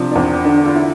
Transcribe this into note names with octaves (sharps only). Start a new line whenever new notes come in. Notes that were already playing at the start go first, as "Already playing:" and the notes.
Already playing: C3 F3 D4
D4
E2 C4
D3 D4
F4
E4